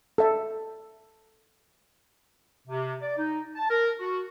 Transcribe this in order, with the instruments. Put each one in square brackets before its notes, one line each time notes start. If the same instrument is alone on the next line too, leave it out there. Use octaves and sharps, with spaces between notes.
[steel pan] A4 E5
[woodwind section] C3
D5
D#4
A5
A#4
F#4